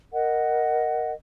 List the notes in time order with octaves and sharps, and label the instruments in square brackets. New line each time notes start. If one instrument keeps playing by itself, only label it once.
[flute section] A#4 D#5 F#5